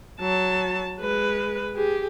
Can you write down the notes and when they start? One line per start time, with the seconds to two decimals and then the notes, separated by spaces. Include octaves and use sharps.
0.20 F#3 A5
1.00 G#3 B4
1.75 G4 G#4